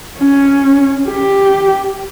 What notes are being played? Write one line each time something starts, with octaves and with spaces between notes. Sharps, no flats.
C#4
G4